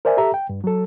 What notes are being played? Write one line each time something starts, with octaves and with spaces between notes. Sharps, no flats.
A#4 C5 D5 E5 G#5
G4 A4 E5 A#5
G5
G2
F#3 A4